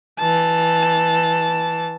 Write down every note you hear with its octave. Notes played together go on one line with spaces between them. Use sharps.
E3 A5